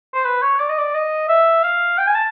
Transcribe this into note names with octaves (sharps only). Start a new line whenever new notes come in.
C5
B4
C#5
D5
D#5
D5
D#5
E5
F5
G5
G#5
A5